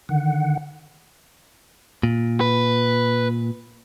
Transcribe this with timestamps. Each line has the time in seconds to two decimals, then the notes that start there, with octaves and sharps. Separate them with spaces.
0.09 D3 D#3 F#5
2.03 A#2
2.41 B4